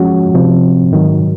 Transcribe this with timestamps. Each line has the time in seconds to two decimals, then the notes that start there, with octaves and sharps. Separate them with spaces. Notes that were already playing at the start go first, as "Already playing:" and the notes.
Already playing: F3 G#3 C#4 F#4
0.34 C3 F3 C4
0.92 G#2 D#3 F#3